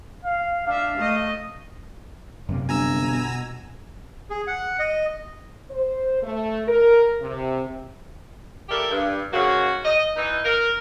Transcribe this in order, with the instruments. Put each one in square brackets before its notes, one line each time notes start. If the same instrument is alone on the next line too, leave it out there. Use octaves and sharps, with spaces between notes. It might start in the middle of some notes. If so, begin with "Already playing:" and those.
[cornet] F5
[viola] D4 E5 [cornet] F5
[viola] A3 D#5
[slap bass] F#2 C3 A#3
[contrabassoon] G1 [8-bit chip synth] G#5 A#5 E6
[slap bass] B2
[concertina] G#4
F#5
D#5
[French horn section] C5
A3
A#4
C3
[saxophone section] G3 E4 G4 A4 A#4
G2
G#2 C#3 A#3 F#4
D#5
E3 D#4
A#4